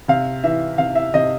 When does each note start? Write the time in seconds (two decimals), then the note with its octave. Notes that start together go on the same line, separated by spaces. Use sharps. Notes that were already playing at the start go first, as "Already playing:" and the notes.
0.08 C3 F5
0.44 E3 E5
0.78 C3 F5
0.95 E5
1.14 C3 D#5